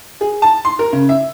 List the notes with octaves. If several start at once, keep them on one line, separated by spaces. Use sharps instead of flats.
G#4
A5
C6
A#4
C#3
E5